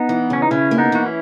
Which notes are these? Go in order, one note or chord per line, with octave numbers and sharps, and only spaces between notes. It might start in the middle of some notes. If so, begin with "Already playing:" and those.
Already playing: B3 D#4
E3
C#3 C#4
D#4
C#3 C#4 E4
A#3
B3 D#4
E3 F#4
C#4 E4